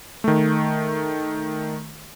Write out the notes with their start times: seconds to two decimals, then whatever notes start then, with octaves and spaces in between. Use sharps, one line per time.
0.24 D#3 A3